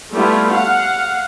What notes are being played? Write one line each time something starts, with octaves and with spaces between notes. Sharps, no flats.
G3 A3 B3 E4 F4
F5 F#5